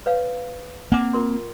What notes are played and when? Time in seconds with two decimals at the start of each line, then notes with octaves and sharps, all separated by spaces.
0.06 B4 C#5 F5
0.92 A#3 C4 F#5 G#5 D6
1.13 F4 A#4 C6